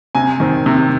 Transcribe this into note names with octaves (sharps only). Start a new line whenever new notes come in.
C3 G#5
D#3 C4
C3